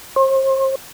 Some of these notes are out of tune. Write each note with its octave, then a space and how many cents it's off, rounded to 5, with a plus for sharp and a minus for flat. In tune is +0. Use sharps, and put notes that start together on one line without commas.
C5 +40